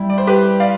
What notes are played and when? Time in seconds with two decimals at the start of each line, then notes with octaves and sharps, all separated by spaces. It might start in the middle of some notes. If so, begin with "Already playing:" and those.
Already playing: G3 E4
0.10 D5
0.18 C5
0.27 G4 B4
0.60 D5 F5